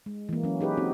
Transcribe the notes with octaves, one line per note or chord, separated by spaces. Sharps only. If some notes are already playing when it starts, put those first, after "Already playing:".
G#3
E3 A#3
F#3 C#4
D#4 G4 G#4 B4
C4 D#4 F#4